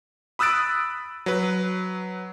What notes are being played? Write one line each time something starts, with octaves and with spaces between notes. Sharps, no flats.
B5 D#6 E6 F#6 A6 D7
F#3 B4